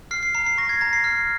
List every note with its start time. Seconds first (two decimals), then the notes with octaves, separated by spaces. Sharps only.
0.11 F6 C7
0.23 C7
0.35 A#5 C7
0.47 C7
0.58 C#6 A#6
0.69 G#6
0.81 A#5 A#6
0.93 C7
1.04 F6